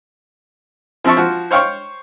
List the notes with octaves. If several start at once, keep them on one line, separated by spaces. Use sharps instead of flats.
F3 C4 E5 A5 C#6
F3 F#4
C5 C#5 F5 G5 C#6